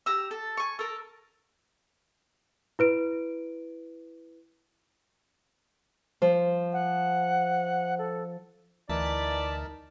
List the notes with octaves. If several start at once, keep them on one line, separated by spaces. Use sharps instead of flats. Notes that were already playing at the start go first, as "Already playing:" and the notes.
G4 A#5 E6
A4
G#5 C#6
A4 A#4
E4 B4 D7
F3
F#5
A4
D2 E3 D#4 A#4 D5 A5 B6